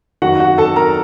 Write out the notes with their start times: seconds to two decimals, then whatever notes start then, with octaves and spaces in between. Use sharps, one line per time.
0.22 F#2 D#3 F#4 F#5
0.40 F#4 F#5
0.58 A4 A5
0.76 A#4 A#5